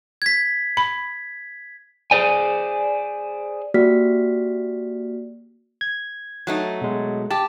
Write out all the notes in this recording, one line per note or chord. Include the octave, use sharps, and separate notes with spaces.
G#6 B6
B5
G#4 C5 D5 G#5
A#3 F#4 G4 D5 F6 B6
G#6
F#3 A3 D#4
B2 G#3
G4 A5